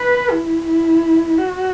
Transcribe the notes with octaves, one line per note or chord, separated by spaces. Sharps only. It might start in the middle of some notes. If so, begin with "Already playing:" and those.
Already playing: B4
E4
E4
F#4